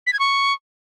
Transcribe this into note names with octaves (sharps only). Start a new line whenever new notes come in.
B6
G#6
C#6